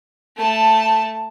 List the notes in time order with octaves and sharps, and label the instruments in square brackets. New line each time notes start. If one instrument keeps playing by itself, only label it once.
[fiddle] A3 A5